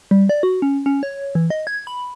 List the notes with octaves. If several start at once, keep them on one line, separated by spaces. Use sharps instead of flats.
G3
D5
F#4
C#4
C#4
C#5
E3
D#5
G#6
B5